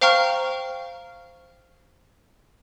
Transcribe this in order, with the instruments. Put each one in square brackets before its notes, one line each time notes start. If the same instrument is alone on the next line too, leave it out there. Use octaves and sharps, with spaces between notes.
[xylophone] C5 F5 G5 A#5 C#6 F6